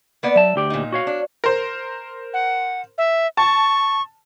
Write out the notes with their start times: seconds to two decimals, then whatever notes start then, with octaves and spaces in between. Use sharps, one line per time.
0.23 A#3 B3 D5
0.36 F#3 E5 A5
0.56 D2 G4 D5
0.70 A#2 D#4
0.92 F#4 C#5 F5
1.07 D4
1.44 A#4 C5
2.34 F#5
2.98 E5
3.37 A5 C#6